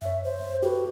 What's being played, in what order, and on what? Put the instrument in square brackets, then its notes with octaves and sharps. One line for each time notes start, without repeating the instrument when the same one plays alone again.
[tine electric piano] F#2 C#5 [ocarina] E5
[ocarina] C5
[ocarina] F#4 [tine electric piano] G4 A4 B4